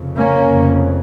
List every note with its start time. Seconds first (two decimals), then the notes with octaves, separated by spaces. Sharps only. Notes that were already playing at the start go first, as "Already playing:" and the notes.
Already playing: F1 F2 C#3
0.17 A#3 C#4
0.51 F1 F2 C#3